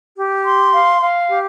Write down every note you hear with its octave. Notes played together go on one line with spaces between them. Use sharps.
G4
C6
F5
F5
G4